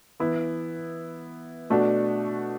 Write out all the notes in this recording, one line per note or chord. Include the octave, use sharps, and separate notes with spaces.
E3 B3 E4
B2 A3 D4 F#4